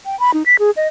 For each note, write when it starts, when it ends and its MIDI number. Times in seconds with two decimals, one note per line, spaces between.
0.06 0.19 79
0.20 0.31 83
0.34 0.43 63
0.46 0.56 95
0.59 0.71 68
0.77 0.87 75